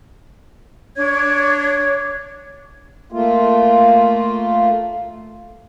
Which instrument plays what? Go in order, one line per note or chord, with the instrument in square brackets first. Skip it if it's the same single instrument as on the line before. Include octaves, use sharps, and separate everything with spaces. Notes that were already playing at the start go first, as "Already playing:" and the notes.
[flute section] D4 C#5 G#6
[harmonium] A3 A#3 F4